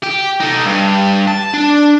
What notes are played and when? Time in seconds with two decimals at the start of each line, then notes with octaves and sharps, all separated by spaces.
0.03 G4
0.40 D#4 A4
0.65 G2
1.28 A5
1.54 D4